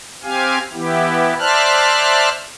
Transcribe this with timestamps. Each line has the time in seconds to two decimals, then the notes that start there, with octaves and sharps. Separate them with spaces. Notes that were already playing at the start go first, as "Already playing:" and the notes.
0.23 C4 G4 F5 G#5
0.73 E3 B3 E4 G4
1.39 C5 D5 E5 A5 F6 F#6